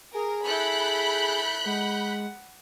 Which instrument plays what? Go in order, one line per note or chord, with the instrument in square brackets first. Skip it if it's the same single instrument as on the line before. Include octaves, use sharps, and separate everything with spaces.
[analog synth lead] G#4 [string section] A#4
[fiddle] E4 A4 [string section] B5 F#6 G6
[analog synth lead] G#3 [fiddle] F#5